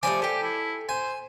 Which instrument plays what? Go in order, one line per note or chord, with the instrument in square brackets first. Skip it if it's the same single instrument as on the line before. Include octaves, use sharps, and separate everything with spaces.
[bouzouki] F3 G3 A3 [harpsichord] G#5 B5 [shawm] D6
[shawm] G4 [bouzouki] A4 G5
[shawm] E4
[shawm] C5 [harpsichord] G#5